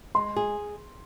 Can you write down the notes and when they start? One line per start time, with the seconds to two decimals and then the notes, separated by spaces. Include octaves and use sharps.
0.15 G#3 C6
0.36 G#4